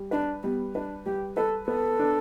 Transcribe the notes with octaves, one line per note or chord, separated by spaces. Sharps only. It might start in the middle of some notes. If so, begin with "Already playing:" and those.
Already playing: G3
D4 B4
G3 B3
D4 B4
G3 G4
A4 B4
B3 A4
D4